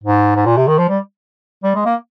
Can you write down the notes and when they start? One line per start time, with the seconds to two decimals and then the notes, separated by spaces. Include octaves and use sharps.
0.03 G#2
0.36 G#2
0.46 A#2
0.56 C3
0.67 D#3
0.78 F3
0.88 G3
1.63 G3
1.75 G#3
1.85 A#3